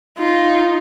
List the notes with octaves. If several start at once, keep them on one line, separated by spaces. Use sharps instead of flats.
D#4 F4